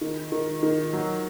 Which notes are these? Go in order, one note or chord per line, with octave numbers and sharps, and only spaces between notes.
D#3
D#3
D#3
F#3